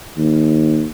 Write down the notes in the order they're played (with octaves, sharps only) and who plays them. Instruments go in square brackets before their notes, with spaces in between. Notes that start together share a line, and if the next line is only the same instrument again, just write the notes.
[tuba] D#2